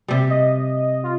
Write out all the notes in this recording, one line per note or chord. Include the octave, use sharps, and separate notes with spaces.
C3 G3
D#5
F4